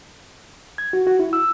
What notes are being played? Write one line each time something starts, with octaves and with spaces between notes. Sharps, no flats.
G#6
F#4
F#4
E4
E6